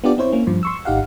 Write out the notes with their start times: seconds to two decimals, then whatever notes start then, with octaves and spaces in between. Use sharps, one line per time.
0.04 B3 D4 F4 G4 D5
0.18 C4 E4 C5 C#5
0.33 A#3 C#4
0.47 G2 F3
0.63 C6 C#6 E6
0.85 G#1 D#4 G4 F5 F#5